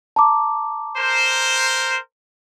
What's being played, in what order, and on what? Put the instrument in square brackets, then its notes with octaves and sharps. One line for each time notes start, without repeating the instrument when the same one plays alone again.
[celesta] A5 A#5 D6
[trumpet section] A#4 C5